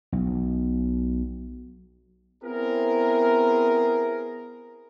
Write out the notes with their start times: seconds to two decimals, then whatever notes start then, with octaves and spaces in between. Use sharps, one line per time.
0.12 B1
2.43 B3 C4 E4 G#4 A#4